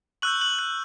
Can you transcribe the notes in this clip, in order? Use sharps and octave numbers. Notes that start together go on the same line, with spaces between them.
C#6 E6 F#6 G6 F#7
F#6 F#7
F#6 F#7